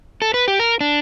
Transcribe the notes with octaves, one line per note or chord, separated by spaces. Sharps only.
A4
B4
G4
A#4
D4